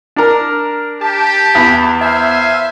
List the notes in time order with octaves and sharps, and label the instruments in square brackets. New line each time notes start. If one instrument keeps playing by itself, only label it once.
[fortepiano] D4 A#4
[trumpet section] G4 [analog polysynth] A5
[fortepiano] E2
[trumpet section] C5 F5 G#5 [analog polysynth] E5